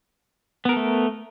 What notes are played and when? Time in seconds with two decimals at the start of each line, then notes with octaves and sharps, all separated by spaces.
0.65 B3
0.69 A#4
0.73 A4
0.76 A3